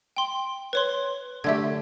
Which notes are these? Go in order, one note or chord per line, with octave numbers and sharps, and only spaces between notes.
G5 C6
B4 C#5 C6
D3 A3 G4 G#6